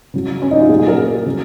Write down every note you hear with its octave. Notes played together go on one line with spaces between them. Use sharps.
C#3 F#3
C#4
D#4
F4
A#2 F#3 G#4
G#4
A#4
G#4
C#3 F#3